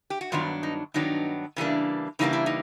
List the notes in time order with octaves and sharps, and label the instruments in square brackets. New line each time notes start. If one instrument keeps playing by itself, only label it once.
[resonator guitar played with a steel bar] G4
F#4
G2 D#3 F#3 B3 D4 F4
D#4
G2 D#3 F#3 B3 D4 D#4
C#3 E3 G3 A#3 D4
C#3 E3 G3 A#3 D4 D#4
E4
D#4